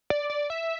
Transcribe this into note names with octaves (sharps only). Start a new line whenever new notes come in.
D5
D5
E5